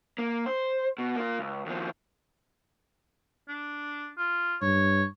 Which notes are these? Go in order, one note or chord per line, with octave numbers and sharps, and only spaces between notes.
A#3
C5
B2
A#3 F4
C#2
D#2 F3
D4
F4
G2 C#5